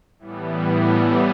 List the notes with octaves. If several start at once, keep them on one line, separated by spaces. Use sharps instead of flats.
A2 E3 G3 B3